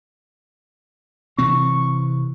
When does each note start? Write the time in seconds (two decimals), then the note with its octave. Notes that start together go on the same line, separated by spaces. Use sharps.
1.38 C3 E3 C4 C#6